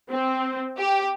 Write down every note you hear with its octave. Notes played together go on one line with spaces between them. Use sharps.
C4
G4